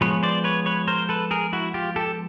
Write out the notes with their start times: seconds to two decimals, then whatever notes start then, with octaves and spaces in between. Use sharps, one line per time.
0.01 F3 G#3 B3 B4 C#5
0.23 C5 D5
0.44 B4 C#5
0.66 B4 C#5
0.88 A#4 C5
1.09 A4 B4
1.31 G#4 A#4
1.53 E4 F#4
1.74 F4 G4
1.96 G4 A4